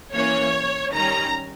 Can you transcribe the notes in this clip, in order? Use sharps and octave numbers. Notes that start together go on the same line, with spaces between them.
E3 A#3 C#4 C#5
D#3 G3 C#4 A#5